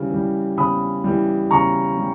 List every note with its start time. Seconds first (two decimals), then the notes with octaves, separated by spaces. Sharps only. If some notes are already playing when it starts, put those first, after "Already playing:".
Already playing: C#3 E3 G3
0.10 E3 G3
0.57 C#3 B5 D#6
1.04 E3 G3
1.51 C#3 A#5 C#6
1.98 G3